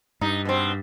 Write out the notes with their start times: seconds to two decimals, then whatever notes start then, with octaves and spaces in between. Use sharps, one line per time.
0.21 G2 D#4
0.45 B2 C4